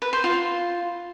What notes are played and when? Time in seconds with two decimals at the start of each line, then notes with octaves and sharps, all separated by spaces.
0.02 B4
0.13 C5
0.24 F4